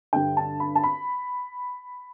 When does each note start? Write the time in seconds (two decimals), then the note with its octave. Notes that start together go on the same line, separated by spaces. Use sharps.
0.13 G2 D3 G5
0.37 A5
0.60 B5
0.75 A5
0.83 B5